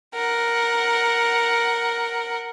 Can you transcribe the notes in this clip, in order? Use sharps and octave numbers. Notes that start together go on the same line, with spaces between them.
A#4 F#5